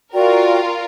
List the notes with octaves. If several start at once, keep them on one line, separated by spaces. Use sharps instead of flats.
F4 F#4 A#4 D5 G5